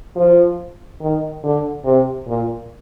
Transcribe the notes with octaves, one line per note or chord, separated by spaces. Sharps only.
F3
D#3
D3
C3
A#2